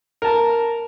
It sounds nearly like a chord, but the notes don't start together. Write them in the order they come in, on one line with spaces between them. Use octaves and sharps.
A#4 A5 A#5